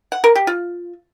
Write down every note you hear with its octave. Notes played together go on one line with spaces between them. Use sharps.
F#5
A#4
G4
F4